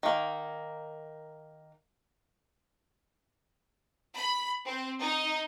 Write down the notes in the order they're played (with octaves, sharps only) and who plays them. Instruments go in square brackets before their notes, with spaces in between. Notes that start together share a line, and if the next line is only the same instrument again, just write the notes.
[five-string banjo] D#3 A#3
[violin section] B5
C4
D#4